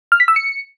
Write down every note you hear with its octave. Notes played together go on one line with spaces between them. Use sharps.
F6
B6
E6
C#7